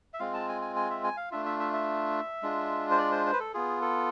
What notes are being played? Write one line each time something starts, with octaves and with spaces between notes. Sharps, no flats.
E5
G#3 C4 F4 F5
A5
G#5
G#5
G#5
E5
G#5
F5
A3 D4 F4 E5
E5
E5
E5
G#3 D4 F4
C5
D5
C5
C5
B4
A4
B3 F4 G#4
A4